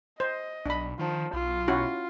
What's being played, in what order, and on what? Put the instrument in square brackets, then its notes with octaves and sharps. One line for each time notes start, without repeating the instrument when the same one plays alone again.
[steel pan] C5 [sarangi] D#5
[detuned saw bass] B1 [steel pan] D4 B5
[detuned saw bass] D#3 [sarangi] F3
[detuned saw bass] B1 [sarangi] F4
[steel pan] C#4 E4 F#4